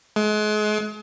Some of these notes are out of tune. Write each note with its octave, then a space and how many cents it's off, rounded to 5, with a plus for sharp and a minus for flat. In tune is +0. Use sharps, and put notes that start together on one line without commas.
G#3 +35